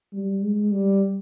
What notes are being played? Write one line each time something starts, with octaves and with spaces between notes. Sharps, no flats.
G3
G#3
G3